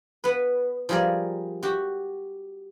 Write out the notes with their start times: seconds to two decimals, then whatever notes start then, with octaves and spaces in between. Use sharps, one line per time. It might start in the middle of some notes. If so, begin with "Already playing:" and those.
0.24 B3 B4
0.89 F3 G3 G#4 A#4 D5
1.63 F#4 G4